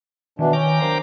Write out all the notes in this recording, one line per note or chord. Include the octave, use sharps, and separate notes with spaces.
B2 D#3 E3 D4
C#4 G5 A#5 D6
F#3 A#3 D4 C5